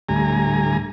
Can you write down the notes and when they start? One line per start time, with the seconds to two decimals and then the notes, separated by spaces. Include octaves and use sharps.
0.09 D2 A2 G3 G#5 A#5